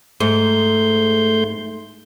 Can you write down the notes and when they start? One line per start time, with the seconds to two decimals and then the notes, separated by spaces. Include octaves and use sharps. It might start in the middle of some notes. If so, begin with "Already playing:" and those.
0.20 G#2 A3 C6 G6